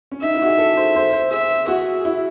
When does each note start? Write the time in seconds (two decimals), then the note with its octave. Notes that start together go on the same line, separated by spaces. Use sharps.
0.12 C#4
0.22 D#4 E5
0.34 E4
0.42 F#4
0.46 G#4
0.58 A4
0.77 C5
0.96 C5
1.13 C5
1.31 G#4 E5
1.68 F#4 G#4
2.05 E4